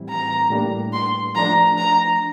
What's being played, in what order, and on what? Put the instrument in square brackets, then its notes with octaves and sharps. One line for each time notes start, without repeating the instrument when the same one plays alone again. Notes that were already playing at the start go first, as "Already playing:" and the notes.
Already playing: [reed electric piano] A2 E3 G3 C4 E4
[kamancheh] A#5
[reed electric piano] A2 G3 A#3 D4
[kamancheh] C6
[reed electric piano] F3 A3 D4 [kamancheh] A#5
[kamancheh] A#5